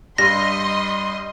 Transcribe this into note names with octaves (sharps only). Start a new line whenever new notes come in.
G2 G3 D#5 C6 A#6